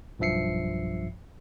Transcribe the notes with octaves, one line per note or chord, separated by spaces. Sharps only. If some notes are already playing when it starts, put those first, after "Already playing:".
B1 G2 F3 E5 C7 C#7